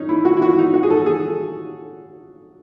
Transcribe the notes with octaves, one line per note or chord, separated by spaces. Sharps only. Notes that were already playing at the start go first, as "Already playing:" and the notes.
Already playing: C#4 D#4
E4
F#4
E4
F#4
D#4
F#4
G#4
A4
G#4